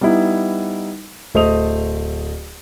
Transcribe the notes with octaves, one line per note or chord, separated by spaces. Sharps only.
G3 B3 D#4 E4
D1 A3 C5 D#5 D#6 F7